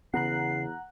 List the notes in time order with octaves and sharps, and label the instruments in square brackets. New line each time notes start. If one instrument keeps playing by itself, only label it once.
[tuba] E2 [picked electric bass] C#3 B3 [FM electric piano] F#5 A#5 F#6 [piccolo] C7